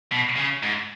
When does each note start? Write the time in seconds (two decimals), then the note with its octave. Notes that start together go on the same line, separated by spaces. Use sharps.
0.12 B2
0.37 C#3
0.63 G#2